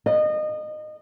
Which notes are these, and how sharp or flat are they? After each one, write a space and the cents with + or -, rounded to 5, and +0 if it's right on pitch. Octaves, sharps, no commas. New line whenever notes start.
D#5 -25